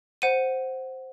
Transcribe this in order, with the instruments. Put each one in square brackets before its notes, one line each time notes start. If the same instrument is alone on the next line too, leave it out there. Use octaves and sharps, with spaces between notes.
[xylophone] C5 F#5 D#7